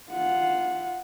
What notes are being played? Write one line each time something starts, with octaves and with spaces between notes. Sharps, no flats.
F4 F#5